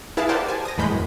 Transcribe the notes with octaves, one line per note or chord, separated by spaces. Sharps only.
E4 G#4 B4 F5 A5
G4 A#4 C5 D5 F#5 A5
G#5 A5
D#6 A#6
E2 A2 G#3 B5 G6
F#2